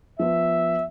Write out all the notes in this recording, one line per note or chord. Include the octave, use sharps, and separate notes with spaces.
F3 B3 E5